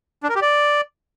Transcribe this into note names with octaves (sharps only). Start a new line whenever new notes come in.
D4
A#4
G4
D5